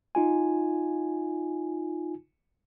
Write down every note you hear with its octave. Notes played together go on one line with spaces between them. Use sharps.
D#4 F4 G#5